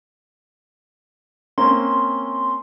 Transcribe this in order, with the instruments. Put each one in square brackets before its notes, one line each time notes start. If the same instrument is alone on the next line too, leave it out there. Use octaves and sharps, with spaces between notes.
[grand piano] A#3 C4 C#4 [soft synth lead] C6